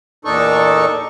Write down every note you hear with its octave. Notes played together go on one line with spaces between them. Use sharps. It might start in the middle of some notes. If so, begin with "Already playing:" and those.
E2 A#2 D4 D#4 A4 C#6